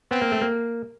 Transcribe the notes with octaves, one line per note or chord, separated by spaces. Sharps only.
B3 C4
A#3
A3
A#3